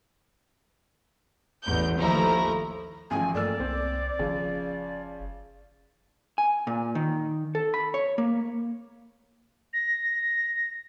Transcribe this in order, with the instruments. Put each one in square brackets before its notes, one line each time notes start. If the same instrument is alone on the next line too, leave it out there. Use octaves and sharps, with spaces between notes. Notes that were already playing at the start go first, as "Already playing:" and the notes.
[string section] A1 E2 G6
D#2 F3 A3 E4 A#5
[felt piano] A1 F3 [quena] G#5
[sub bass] G2 [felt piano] A3 A#3 E6 [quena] D5
[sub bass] C2 [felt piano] C4
[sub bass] F#1 [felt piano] C#3 F3
[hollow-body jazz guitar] G#5
A#2
D#3
A4
B5
C#5
A#3
[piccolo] A#6